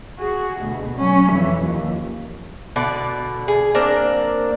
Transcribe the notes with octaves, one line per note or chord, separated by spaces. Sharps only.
F#4 G#4
D2 B2
F#3 C#4
F2 E3
D#2 F3
B2 D3 D5
G#4
A#3 C4 D4 A#4